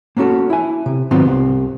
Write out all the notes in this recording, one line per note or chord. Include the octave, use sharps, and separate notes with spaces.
A#3 B3 C#4 F#4 A4
E4 G#5
C3
G#2 D#3 F#3 B3 C4 F4
C2